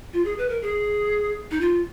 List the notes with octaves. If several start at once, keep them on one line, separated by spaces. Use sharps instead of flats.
F4
G#4
B4
A#4
G#4
D#4
F4